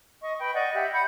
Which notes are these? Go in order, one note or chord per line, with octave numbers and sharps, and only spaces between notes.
D#5 C#6
B4 G5
D5 D#5 F#5 C#6
G4 E5 F#5
F#5 B5 G6